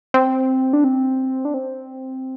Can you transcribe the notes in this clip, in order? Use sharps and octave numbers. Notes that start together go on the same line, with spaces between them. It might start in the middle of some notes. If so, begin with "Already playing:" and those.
C4
D4
C4
D4
C4